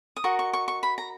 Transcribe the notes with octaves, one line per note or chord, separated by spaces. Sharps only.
D#6
F#4 A#4 D#5 C#6
C#6
C#6
C#6
B5
A#5